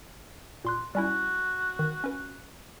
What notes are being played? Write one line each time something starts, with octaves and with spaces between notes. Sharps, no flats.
A#2 C6 F#6
G3 C#4 E4 F#4
D#3
C#4 B4